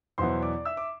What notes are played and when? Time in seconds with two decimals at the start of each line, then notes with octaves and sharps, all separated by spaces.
0.18 E2 B2 F#3 B3 E4 C5 C6
0.42 D5 D6
0.65 E5 E6
0.77 D6